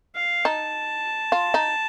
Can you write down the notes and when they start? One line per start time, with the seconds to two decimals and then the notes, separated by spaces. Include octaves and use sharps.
0.16 F5
0.45 D#4 A5
1.32 F4
1.54 D#4